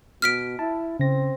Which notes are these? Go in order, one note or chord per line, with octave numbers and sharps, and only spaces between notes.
B2 F6 B6 D7
E4 A5
C#3 C4 A#6